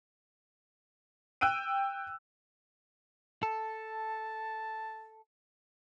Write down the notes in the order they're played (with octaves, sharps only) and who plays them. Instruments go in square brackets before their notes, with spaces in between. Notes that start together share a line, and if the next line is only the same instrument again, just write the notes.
[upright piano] G5 E6 F#6 D7 D#7
[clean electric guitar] A4 [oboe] A5